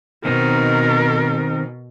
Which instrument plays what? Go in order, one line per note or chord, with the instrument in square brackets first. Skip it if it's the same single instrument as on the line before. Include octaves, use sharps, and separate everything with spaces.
[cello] B2 [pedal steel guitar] D#3 C4 D#4 [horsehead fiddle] A#4